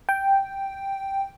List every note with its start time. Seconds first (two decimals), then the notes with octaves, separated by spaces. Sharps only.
0.09 G5